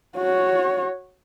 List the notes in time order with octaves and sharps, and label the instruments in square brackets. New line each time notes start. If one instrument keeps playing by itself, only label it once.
[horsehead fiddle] F#4 C#5